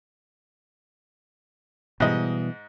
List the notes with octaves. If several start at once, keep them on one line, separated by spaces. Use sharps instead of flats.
G#2 B2 E3 G3 D#5